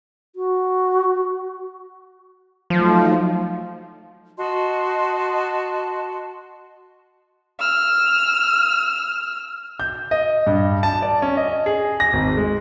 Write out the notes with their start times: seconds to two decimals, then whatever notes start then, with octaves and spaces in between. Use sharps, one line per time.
0.36 F#4
2.70 F3 F#3 A3 D#4
4.38 F#4 D#5 A5 C6
7.59 E6 F6
9.80 G6
10.11 D#5
10.47 G2
10.83 A5
11.02 D5
11.22 C#4
11.37 D#5
11.66 G#4
12.00 A#6
12.13 G#1
12.37 G#3